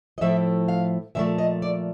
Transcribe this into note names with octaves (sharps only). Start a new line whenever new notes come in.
D#5
A2 F3 A3 E5
F5
A#2 F3 A3 E5
D#5
D5